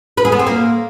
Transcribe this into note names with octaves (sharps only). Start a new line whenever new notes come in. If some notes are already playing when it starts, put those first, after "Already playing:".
B4
G#4
B3
C4
A#3